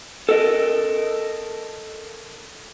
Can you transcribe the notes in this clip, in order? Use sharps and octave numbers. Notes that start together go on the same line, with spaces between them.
A4 A#4 D#5